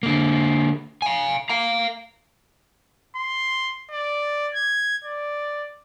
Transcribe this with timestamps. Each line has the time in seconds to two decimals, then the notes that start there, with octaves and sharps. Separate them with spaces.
0.03 D3 A#3
1.02 F5 G#5
1.49 F5 A#5
3.16 C6
3.91 D5
4.55 G#6
5.04 D5